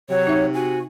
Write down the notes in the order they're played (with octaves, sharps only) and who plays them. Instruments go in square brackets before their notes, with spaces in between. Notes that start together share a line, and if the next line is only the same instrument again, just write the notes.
[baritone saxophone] C3 [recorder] F#3 [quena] C#5
[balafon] D#4 E5
[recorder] F#4 [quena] G#5